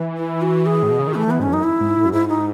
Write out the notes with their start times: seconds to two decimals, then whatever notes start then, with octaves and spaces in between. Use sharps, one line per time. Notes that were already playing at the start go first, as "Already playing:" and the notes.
Already playing: E3
0.17 E4
0.42 F#4
0.66 G#4
0.83 A2
0.91 B2
0.99 C#3
1.07 D#3
1.15 E3 A3
1.27 E3 B3
1.40 G#2 C#4
1.48 E2
1.52 F#2 D#4
1.63 E4
1.80 G#2
1.97 A2
2.05 F#2
2.13 G#2 E4
2.28 D#4